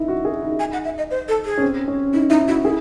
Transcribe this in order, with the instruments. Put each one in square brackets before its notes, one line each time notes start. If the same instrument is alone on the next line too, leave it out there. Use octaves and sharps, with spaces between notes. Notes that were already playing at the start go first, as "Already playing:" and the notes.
Already playing: [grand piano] D#4 E4
F#4
G#4
D#4
[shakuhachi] G#5
F#5
E5
D#5
C5
A4
G#4
[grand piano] C#4
C4
C#4
[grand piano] D#4 [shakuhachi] E4
[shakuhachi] D#4 [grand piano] E4
[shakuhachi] E4 [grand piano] F#4
[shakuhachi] E4 [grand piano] G#4